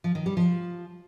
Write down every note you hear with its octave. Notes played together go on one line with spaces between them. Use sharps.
F3
D#3
G3
F3